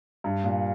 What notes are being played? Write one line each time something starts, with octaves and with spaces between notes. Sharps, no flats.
G2
A#2